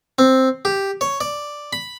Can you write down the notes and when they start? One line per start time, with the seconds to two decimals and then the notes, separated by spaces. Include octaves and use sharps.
0.19 C4
0.65 G4
1.01 C#5
1.21 D5
1.73 B5